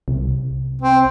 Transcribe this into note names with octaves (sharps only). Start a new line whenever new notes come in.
C2
C4